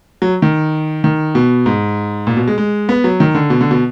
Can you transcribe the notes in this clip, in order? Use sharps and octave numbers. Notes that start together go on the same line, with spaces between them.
F#3
D#3
D#3
B2
G#2
A#2
B2
G#3
G#3
B3
F#3
D#3
D3
B2
D3
B2